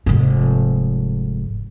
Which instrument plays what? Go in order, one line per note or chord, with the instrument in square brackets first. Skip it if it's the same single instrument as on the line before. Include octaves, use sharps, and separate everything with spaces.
[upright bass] F1 G#2